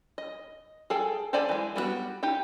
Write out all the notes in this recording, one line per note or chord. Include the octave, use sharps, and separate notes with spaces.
D#5
G#4 A4 G5
G4 A4 C5 D5 G#5
E3 G#3
G3 B3 D4 F#4
D#4 G4 G5